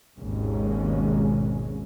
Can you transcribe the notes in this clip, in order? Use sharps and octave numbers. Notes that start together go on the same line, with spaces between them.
G#1 D#2 G#2 B2 G#3 C#4